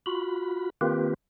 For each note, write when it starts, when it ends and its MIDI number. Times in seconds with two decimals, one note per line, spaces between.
0.06 0.70 65
0.06 0.70 66
0.06 0.70 83
0.81 1.14 51
0.81 1.14 58
0.81 1.14 60
0.81 1.14 65
0.81 1.14 67
0.81 1.14 71